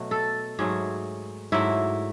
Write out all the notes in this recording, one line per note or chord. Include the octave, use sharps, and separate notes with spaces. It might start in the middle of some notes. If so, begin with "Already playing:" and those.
Already playing: B2 F#3 A3
A4
G#2 F#3 A3 G#4
G#2 F#3 A3 E4